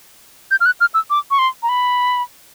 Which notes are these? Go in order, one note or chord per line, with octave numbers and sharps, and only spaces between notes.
G6
F6
F#6
F6
E6
D6
C#6
C6
A#5
B5